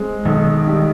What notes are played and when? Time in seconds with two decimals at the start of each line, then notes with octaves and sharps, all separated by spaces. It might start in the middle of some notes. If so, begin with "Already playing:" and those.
Already playing: G#3 C4
0.25 B1 D#3
0.67 G3